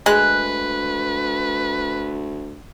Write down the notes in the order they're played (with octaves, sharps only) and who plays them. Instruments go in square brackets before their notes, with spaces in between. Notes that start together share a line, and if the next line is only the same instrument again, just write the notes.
[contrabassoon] D2 [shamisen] G#3 [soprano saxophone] B4 [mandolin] F#6